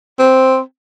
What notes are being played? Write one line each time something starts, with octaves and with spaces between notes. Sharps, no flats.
C4